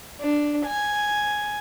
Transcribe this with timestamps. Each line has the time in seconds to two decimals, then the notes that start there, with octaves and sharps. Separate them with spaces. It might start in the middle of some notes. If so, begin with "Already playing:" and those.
0.21 D4
0.66 G#5